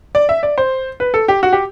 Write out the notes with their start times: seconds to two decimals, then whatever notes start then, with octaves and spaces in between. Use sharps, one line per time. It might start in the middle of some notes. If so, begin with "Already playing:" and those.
0.15 D5
0.29 E5
0.43 D5
0.58 C5
1.00 B4
1.14 A4
1.28 G4
1.43 F#4
1.53 G4